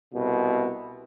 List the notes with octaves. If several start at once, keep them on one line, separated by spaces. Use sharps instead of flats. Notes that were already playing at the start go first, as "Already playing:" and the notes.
C2 B2